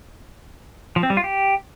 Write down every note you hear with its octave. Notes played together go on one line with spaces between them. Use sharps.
F3
C4
G3
F4
G4